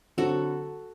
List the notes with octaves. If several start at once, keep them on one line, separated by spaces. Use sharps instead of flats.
D3 F#3 C4 F#4 A4